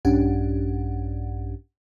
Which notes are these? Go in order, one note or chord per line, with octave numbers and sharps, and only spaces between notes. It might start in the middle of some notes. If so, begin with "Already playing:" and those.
A#1 G2 C#4 D4 G4 F#5